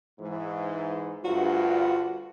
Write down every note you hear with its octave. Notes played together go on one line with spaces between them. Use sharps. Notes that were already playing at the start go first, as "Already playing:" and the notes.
G#2 E3
D2 G2 F4 F#4